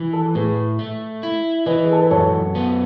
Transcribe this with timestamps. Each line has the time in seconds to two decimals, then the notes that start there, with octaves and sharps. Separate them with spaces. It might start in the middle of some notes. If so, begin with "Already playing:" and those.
Already playing: E3
0.13 A4
0.35 A2 G#4 B4
0.79 A3
1.23 E4
1.66 E3 B4 D#5
1.84 G#4
1.92 A4
2.02 B4
2.11 F#2 A4 C#5
2.55 B3